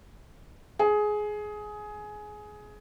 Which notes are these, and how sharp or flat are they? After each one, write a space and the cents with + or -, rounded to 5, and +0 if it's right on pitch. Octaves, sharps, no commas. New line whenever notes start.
G#4 +15